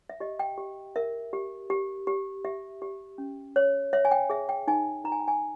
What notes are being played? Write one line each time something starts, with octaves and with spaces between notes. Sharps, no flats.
E5
G4 D#5
G5
G4
A#4 E5
G4
G4
G4
G4 E5
G4
C#4
C#5
C#5 E5
G#5
G5
G#4 E5
G5
D#4 G#5
D#4 A#5
G#5
G5
G#5